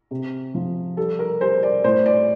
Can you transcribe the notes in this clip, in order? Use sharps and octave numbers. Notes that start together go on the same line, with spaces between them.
C3
F3
G3 A4
A#4
G3 C5
D5
A2 C5
D5